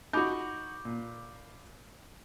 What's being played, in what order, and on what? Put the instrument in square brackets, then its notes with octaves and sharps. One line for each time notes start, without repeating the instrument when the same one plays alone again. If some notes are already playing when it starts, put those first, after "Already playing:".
[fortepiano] D#4 F#4 [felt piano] B5 D6 G6
[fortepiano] A#2